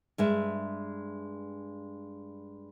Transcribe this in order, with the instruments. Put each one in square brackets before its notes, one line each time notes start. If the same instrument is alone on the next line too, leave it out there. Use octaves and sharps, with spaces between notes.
[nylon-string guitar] G2 G#3 E5